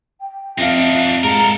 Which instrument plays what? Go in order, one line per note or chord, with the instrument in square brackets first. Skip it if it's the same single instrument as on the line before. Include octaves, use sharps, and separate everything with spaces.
[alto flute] G5
[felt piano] F2 F5 [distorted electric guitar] D4 D#4 [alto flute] E5
[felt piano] G#2 [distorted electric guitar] A4 A#4 [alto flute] A#5